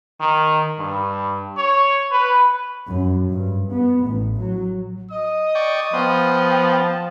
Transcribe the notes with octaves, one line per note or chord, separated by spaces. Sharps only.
D#3
G2
C#5
B4
F#2
G2
B3
A1
F#3
D#5 D#6
D5 G5 C#6
F3 B3 C5 G5
A5